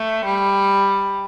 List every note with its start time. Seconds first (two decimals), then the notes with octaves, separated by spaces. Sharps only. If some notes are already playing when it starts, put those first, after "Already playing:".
Already playing: A3
0.26 G3